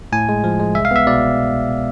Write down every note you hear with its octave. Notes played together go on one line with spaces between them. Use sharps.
A2 G#5
G#3
F3
G#3
C2 E5
F5
B3 E5
B2 D5